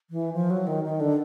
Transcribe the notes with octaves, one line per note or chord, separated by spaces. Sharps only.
E3
F3
F#3
D#3
D#3
D3